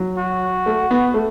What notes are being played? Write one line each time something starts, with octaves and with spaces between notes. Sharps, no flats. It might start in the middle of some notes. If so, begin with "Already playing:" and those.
Already playing: F#3
F#4
A3
B3
A3